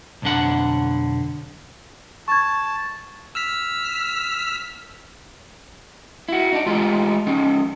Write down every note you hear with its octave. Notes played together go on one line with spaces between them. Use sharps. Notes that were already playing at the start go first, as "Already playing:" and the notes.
B1 F2 D3 F#5
A5 C#6 G#6
E6 F6 B6
E4 F#4
D4 D#4
G#3 A3 D#4 F4 G4
F3 C#4 D#4